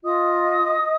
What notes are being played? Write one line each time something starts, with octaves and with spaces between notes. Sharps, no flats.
F4 D#5 D#6